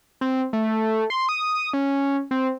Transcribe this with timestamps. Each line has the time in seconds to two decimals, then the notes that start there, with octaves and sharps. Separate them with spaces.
0.21 C4
0.53 A3
1.10 C6
1.29 D#6
1.73 C#4
2.31 C4